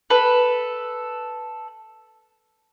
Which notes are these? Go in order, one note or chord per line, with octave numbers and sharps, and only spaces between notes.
A4 B4